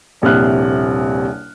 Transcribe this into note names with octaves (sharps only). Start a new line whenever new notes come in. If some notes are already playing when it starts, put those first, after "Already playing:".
D#1 A#1 C3 E4 F6 F#6